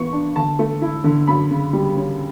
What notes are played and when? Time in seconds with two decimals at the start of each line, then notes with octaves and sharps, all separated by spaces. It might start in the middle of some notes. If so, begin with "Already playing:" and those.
Already playing: E3 B3 C#6
0.13 D4
0.35 D3 A5
0.59 A3
0.82 E4
1.04 D3
1.27 F#2 B5
1.51 C#3
1.73 G3
1.96 C#4